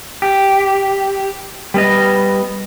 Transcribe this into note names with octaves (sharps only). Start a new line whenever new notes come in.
G4
G3 B3 D#5